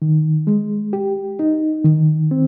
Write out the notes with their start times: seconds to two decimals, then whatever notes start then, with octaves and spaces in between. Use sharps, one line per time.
0.02 D#3
0.47 G#3
0.93 G4
1.39 D#4
1.84 D#3
2.31 C4